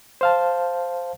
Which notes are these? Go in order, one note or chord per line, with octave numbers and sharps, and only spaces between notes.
C5 F5 A5